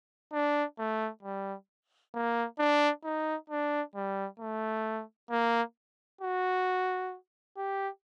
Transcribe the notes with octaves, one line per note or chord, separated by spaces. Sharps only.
D4
A3
G3
A#3
D4
D#4
D4
G3
A3
A#3
F#4
G4